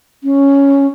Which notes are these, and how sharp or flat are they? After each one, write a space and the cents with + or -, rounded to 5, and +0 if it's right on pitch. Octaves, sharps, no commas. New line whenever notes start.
C#4 +0